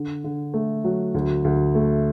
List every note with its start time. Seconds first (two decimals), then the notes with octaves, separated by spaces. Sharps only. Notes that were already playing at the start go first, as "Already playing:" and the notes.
Already playing: D3
0.24 D3
0.54 A3
0.84 F#3
1.14 D2
1.44 D2
1.75 A3